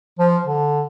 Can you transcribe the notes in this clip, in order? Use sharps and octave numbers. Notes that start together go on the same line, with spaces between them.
F3
D3